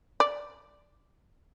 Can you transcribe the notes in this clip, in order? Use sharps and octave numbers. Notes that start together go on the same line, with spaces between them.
D5